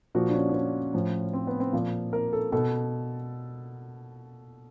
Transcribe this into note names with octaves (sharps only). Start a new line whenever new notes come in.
A#2 F3 F#4
D4
C#4
D4
C#4
A2 F3
C4
B3
C4
A#2 F3 F4
A#4
A4
B2 A4